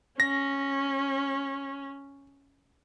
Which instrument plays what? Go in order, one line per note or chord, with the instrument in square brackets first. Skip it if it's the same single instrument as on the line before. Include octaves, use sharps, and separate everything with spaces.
[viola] C#4 [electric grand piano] A#6